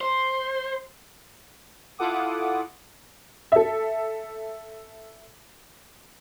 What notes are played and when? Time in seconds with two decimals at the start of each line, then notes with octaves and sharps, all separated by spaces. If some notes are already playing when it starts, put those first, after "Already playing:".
0.01 C5
1.98 E4 F4 A4 F#5 D6 D#6
3.52 A4 E5